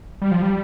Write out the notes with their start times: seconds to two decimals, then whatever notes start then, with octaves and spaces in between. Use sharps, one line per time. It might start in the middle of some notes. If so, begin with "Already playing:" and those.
0.22 G3
0.31 F3
0.42 G3